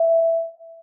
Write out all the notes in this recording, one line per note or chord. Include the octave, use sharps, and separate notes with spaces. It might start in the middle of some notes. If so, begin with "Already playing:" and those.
Already playing: E5